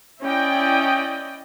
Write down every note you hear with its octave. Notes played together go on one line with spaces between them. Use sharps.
C#4 E4 D5 D#5 G5